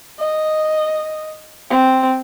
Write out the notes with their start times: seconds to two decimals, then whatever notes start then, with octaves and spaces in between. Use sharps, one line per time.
0.20 D#5
1.70 C4